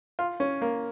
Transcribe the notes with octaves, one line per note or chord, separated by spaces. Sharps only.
F4
C#4
A#3